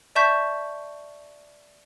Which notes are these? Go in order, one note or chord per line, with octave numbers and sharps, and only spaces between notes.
D5 E5 A5 C#6 G6 B6